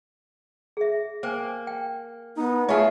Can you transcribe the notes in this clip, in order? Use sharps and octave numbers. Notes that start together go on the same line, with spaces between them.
G#4 E5
A#3 C5 G5 G#5
G5
B3 D#4
A3 E4 F4 G#4 C#5